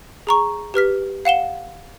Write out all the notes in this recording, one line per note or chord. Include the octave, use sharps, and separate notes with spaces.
G#4 A#5 C#6
G4 B4 F6 B6
F5 F#5 E7 G7